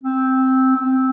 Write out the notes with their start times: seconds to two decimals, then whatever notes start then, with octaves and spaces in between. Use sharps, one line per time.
0.04 C4
0.76 C4